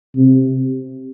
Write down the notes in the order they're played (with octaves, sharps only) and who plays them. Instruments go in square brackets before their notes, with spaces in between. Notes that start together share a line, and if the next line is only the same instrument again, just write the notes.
[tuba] C3